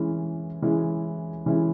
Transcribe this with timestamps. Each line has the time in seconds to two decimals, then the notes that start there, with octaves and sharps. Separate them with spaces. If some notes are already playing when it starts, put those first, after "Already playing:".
Already playing: E3 G#3 C#4 E4
0.62 E3 G#3 C#4 E4
1.46 E3 G#3 C#4 E4